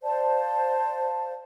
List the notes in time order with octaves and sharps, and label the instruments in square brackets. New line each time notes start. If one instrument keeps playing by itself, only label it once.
[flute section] C5 D5 F5 A5